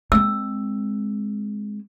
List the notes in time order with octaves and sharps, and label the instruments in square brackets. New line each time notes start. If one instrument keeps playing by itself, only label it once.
[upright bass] G#3 C4 [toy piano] E6